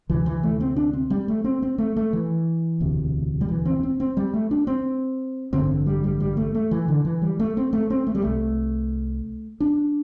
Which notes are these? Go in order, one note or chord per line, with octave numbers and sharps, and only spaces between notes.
D2 C3 E3
E3
A3
C4
D4
C4
G3
A3
C4
C4
A3
A3
E3
E1 D2 C3
G3
E3
C4
C4
C4
G3
A3
D4
C4
A1 G2 D3 C4
G3
G3
G3
A3
A3
E3
D3
E3
G3
A3
C4
A3
C4
A3
G3
C2 C3 A3
D4